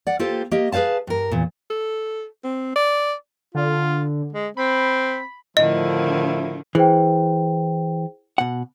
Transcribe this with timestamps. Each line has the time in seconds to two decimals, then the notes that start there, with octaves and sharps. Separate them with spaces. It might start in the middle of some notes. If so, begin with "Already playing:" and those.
0.07 D5 F#5
0.19 A#3 F4 G4 A4 C5
0.51 A#3 G4 D#5
0.72 G#4 B4 C5 F5 A5
1.07 G2 A#4
1.32 E2 A#2
1.70 A4
2.44 C4
2.76 D5
3.55 D3 F4
4.33 G#3
4.57 C4 B5
5.57 A2 D3 D#3 F3 E4 D#5
6.75 E3 G#4 C5 G5
8.38 B2 F#5